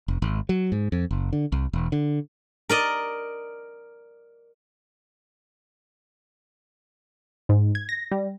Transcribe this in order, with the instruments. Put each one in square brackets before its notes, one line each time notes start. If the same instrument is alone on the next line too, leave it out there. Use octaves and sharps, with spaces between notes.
[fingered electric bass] F1
G#1
F#3
G#2
F2
F#1
D3
C2
E1
D3
[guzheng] A#4 D5 D#5
[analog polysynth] G#2
G#6
A#6
G3